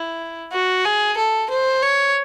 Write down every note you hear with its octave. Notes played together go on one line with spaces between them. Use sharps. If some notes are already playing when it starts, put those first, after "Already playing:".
Already playing: E4
F#4
G#4
A4
C5
C#5